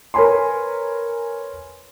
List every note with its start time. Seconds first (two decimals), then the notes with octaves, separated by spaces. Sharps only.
0.14 A#4 B4 C#5 G#5 B5 C6